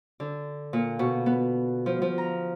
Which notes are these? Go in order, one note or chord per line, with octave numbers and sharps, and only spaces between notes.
D3
A#2
B2
B3
F3
F3
A#5